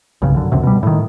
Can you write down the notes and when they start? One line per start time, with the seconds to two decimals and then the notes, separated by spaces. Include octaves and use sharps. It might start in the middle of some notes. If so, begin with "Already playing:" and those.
0.22 B1 G2 C#3
0.35 F#2 D3
0.52 C#2 F#2 C3
0.63 B2 G3
0.83 A2 D#3